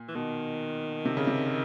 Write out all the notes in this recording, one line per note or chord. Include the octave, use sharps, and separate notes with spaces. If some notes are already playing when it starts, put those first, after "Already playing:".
Already playing: A#2
E3
B2 D#3
C3
C#3
C3